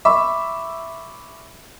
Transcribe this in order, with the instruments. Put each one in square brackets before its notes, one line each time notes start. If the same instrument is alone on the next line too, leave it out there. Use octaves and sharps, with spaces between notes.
[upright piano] E5 [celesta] B5 C#6 D6